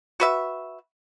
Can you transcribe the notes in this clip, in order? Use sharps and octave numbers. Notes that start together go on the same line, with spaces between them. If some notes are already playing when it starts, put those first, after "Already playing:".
F#4 B4 E5